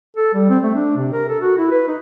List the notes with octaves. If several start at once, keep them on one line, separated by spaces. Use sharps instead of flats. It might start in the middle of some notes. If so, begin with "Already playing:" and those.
A4
G3
C4
A3
D4
C3
A#4
A4
F#4
E4
B4
D#4